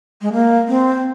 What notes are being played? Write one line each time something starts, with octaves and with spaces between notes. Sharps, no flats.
G#3
A#3
C4